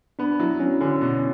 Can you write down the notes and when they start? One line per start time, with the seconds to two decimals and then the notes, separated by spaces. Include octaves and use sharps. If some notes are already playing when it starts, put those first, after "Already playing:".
0.19 B3 D4
0.40 F#3 E4
0.60 F#3 C#4
0.81 D3 C#4
1.01 B2